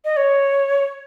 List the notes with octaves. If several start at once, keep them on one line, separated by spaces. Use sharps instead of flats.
D#5
C#5